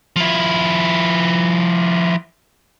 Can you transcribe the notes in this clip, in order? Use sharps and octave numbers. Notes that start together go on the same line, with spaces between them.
F3 E4